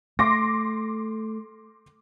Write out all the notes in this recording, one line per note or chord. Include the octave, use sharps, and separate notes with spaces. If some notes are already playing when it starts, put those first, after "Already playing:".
A3 C6 D6 A#6